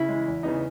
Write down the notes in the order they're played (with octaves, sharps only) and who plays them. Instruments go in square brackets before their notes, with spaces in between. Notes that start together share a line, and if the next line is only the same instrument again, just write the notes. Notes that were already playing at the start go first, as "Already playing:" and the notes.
Already playing: [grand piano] C#3 [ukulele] E4
[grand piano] E3 G#3
E2
C#3 E3 B3 D#4